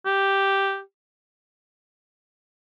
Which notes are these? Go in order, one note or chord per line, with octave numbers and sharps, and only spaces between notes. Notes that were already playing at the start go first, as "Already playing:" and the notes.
G4